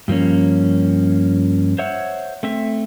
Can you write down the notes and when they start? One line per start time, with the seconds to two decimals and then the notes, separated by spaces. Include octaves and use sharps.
0.08 G2 F3 A#3 C#4
1.78 C5 C#5 E5 F#5
2.43 A3 C4 E5